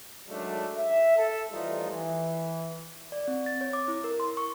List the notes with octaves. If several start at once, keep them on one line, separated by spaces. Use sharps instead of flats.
F#2 D#3 F#3 G#3 A3 D4
E5
A4
E3 F3 G3 A3 D#4 F4
E3
D5
C4
A6
C#5
D6
E4
A#4
C6
C#6